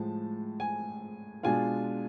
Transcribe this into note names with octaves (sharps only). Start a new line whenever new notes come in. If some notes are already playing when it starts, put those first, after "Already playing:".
Already playing: A2 F3 G#3 A5
G#5
B2 G#3 D4 F4 G#5